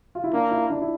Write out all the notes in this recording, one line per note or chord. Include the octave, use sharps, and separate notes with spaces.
F4
E4
A#3 D4
E4
D4
E4